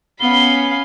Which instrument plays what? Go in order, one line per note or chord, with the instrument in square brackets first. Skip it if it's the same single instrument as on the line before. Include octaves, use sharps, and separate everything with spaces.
[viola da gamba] B3 C#4 [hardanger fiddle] F5 B5 [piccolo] G7